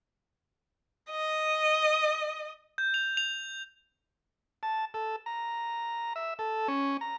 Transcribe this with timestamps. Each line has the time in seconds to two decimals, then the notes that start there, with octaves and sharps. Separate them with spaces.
1.10 D#5
2.78 G6
2.94 F7
3.17 F7
4.63 A5
4.94 A4
5.26 A#5
6.16 E5
6.39 A4
6.68 C#4
7.01 A#5